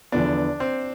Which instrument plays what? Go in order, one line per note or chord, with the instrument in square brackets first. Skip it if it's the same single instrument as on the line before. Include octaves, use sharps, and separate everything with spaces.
[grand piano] E2 D3 F3 B3 [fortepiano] D4
[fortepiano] C4